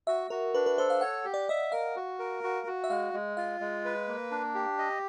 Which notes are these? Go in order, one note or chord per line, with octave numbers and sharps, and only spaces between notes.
F#4 E5
F#4 A#4
D4 B4
B4
A4 C5
F5
C#5 F#5
G4
D5
D#5 E5
A#4 F5
F#4
A#4
F#4
F#4
E5
G#3 F5
G#3
F4 F5
G#3
B4
A#3
D4
G4
D#5